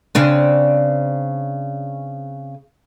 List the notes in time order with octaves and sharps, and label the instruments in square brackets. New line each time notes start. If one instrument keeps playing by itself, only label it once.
[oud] C#3 C4 D4